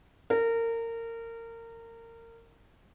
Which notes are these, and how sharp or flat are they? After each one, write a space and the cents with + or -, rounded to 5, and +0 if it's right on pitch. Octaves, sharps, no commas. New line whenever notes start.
A#4 -25